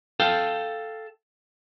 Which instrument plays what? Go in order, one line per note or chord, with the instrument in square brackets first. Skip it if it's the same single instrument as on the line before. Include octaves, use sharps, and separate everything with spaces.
[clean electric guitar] A4 F5 G5